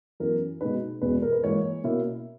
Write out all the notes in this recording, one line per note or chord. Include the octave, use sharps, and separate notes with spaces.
F#2 E3 B3 E4 A#4
B2 G#3 D#4 B4
E2 B2 G#3 B4
A#4
B4
G#2 E3 A#3 C#5
B2 A#3 C#4 E4